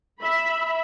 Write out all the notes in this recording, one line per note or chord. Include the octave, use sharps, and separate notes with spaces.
E5 B5